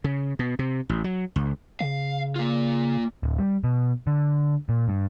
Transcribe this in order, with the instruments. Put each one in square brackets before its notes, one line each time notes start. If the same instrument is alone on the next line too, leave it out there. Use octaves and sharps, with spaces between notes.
[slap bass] C#3
B2
C3
A1
F#3
C#2
[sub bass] C#3 [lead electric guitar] F5
[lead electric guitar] A#3 F4
[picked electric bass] D1
G3
B2
D3
A#2
G2